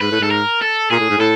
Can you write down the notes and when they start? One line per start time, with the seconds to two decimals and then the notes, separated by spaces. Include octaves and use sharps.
0.01 G#2 B4
0.12 A2
0.21 G#2 A4
0.31 A#4
0.62 A4
0.91 A#2 G#4
0.99 A2
1.10 G#2
1.18 A2 A4